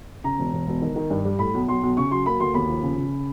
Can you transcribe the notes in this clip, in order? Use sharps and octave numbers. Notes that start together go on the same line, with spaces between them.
C#3 A#5
E1
E1
E1
D#3
D#3
G2
G3
A2 B5
B1
B1 C6
B1
C#3 C#6
F#3 C6
A#3 B5
D2 C6
D#2 B5
F3
C#3
C#3